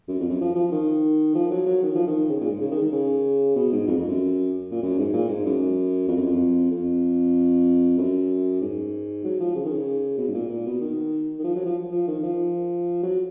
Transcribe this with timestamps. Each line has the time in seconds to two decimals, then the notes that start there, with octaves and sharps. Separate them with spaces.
0.08 F#2
0.20 F2
0.30 F#2
0.41 F3
0.56 F3
0.72 D#3
1.35 F3
1.51 F#3
1.66 F#3
1.83 D#3
1.95 F3
2.07 D#3
2.30 C#3
2.41 A#2
2.50 G#2
2.61 C#3
2.71 D#3
2.82 D#3
2.92 C#3
3.56 B2
3.72 G#2
3.87 F2
3.98 F2
4.08 F#2
4.71 A#2
4.83 F#2
4.99 G#2
5.13 A#2
5.29 G#2
5.46 F#2
6.08 F2
6.17 F#2
6.26 F2
6.72 F2
7.98 F#2
8.61 G#2
9.24 F#3
9.40 F3
9.55 C#3
9.65 D#3
9.74 C#3
10.18 B2
10.28 G#2
10.34 A#2
10.50 A#2
10.66 B2
10.81 D#3
11.39 D#3
11.44 F3
11.56 F#3
11.66 F3
11.91 F3
12.08 D#3
12.23 F3
13.03 F#3